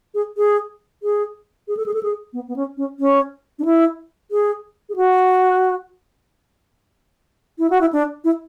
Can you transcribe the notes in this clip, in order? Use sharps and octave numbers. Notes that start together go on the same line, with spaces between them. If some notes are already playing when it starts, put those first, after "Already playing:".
G#4
G#4
G#4
G#4
A4
G#4
A4
G#4
B3
B3
C#4
C#4
C#4
D4
E4
G#4
G#4
F#4
E4
F#4
E4
D4
E4